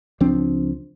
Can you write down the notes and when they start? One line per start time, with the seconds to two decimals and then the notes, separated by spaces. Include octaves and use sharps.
0.20 C#2 F3 C4 D4